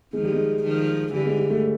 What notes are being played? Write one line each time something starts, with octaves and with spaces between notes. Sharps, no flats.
D#3 F3 G#3
G3
G#3
D#3 F3
D3 E3 G3
G#3
G3
A3